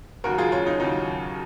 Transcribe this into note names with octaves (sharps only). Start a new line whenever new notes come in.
D#2 C#3 F#3 F#4 A#4
F4 G#4
C#4 F4
D#4
D#2 C#3 F#3 D#4